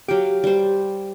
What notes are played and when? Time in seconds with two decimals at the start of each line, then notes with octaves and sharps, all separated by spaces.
0.08 F#3 G4 F5 G5
0.44 G3 C5